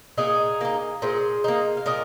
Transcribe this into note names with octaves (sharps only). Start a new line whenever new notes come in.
A#2 D#4 G#4
A#3 D#4
A#2 G#4 C5
A#3 D#4
F5
A#2 A#4 D#5